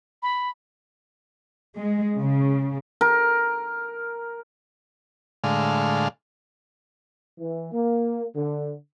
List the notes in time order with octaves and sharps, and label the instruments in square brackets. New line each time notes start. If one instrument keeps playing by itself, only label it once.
[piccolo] B5
[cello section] G#3
C#3
[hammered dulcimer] A#4
[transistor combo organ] A2 D3 G#3 F5
[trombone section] E3
A#3
D3